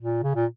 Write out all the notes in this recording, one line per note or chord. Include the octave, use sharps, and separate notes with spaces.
A#2
C#3
A#2